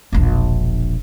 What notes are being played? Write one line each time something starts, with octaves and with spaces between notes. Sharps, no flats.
E1 A#1